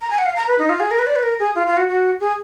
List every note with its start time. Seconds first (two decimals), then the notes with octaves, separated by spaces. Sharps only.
0.01 A#5
0.10 G#5
0.18 F#5
0.26 F5
0.36 A#5
0.47 B4
0.59 D#4
0.69 F4
0.80 G#4
0.91 A#4
0.99 B4
1.07 D5
1.16 B4
1.23 A#4
1.39 G#4
1.55 F4
1.67 F4
1.77 F#4
1.88 F#4
2.20 G#4